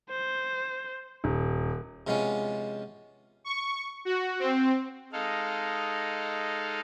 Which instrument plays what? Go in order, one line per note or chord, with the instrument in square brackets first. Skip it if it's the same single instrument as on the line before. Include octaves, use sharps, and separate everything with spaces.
[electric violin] C5
[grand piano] D#1
[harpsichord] C3 F3 G#3 B3 C#4
[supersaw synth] C#6
F#4
C4
[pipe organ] G#3 D#4 A4 F5